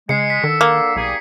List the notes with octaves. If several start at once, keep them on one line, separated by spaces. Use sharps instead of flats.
C#3 G#3 C7 C#7
B6
D3 D#3 A4 E6
A#3
B1 G3 D#4 G#4